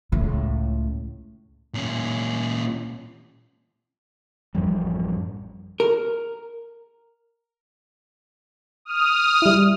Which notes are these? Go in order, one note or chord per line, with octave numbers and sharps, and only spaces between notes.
C#2 A2
A#2 C#4
A1 F#2 F3 G3
A#4
D#6 F6
G3 E4